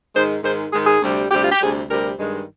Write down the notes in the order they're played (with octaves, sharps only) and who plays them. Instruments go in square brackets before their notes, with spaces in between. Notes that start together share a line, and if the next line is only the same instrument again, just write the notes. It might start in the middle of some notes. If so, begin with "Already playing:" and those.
[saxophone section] G#2 D#3 G#3 C5
G#2 D#3 G#3 C5
G#2 D#3 G#3 G#4
G#4
D2 C3 G3
D2 C3 G3 G4
F4
G4
D2 C3 G3 G#4
D2 C3 G3 A#4
G2 D#3 G#3